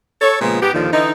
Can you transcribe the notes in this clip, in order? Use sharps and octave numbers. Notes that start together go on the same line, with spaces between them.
A4 C#5
A#2 C#3 F3 G#3 B3
G#2 B3 G4
D#2 A#2 D3 D#3 F3
D3 E3 D#4